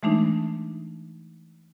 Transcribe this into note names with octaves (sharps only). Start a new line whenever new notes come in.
E3 G#3 A3 D4 D#4